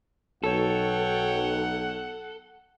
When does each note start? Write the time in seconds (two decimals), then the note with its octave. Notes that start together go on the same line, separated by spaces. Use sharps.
0.44 B1 A4 C#5 F#5 G5